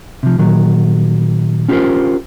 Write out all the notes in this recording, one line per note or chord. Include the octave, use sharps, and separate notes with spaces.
C3 F3
A#2 D#3 F#3
C#4 F4 G4 A4 A#4 C5